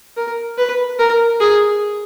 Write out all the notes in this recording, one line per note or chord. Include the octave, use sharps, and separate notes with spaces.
A#4
B4
A#4
G#4